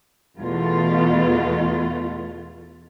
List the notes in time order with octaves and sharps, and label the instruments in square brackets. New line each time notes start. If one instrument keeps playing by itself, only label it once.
[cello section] E2 B2 A3 F4